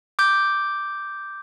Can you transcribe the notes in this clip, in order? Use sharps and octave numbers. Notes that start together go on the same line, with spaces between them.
D6 G6